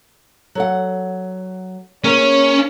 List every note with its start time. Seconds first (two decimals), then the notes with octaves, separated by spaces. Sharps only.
0.55 F#3 A4 F#5
2.04 A#3 C#4 G#4 A#4 C#5